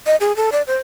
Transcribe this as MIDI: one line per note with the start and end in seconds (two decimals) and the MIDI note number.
0.07 0.16 75
0.20 0.35 68
0.37 0.50 69
0.52 0.62 74
0.67 0.79 72